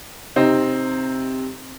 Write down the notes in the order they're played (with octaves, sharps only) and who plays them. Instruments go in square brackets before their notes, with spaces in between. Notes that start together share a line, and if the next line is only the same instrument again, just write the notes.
[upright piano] C3 C4 D#4